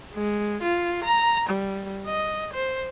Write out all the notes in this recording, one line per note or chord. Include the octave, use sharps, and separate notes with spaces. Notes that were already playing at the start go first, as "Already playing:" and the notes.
G#3
F4
A#5
G3
D#5
C5